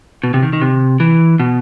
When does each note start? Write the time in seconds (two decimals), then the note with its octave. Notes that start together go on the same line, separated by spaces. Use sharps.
0.23 B2
0.34 C3
0.42 D#3
0.53 D#3
0.61 C3
1.00 E3
1.40 B2